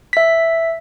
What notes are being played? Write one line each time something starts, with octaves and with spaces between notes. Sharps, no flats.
E5 B6